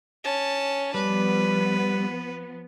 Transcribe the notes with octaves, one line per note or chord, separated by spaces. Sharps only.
C#4 A5
F3 G3 B3 B4